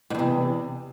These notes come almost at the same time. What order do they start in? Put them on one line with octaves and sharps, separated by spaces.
G#2 E2 C3